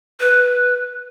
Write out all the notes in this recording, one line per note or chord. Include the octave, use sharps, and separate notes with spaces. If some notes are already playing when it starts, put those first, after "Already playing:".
B4